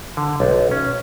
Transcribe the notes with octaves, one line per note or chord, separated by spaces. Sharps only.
D3
B1
C#4